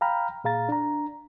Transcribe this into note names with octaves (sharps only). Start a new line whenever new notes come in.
F5 G5 A#5 B5 F6
A#2 G#4 F5 A#5 A6
D4 A#5